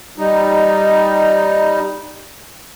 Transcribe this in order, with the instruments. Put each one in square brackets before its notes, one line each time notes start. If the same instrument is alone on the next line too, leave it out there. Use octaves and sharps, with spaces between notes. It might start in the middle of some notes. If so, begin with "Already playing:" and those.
[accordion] G3 D#4